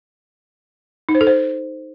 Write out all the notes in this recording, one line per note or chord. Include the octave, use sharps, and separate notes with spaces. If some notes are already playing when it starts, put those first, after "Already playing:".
D#4
C5
A4
C5